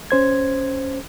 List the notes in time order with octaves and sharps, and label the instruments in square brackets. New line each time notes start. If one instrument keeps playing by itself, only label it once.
[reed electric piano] C#4 C5 G#6